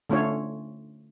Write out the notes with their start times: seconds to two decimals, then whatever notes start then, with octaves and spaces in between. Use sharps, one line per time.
0.10 D3 A3 C#4 F4 C#5